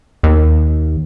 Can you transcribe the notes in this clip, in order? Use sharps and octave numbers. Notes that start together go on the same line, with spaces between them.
D#2